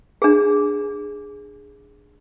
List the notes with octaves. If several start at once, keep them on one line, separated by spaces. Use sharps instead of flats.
D4 G#4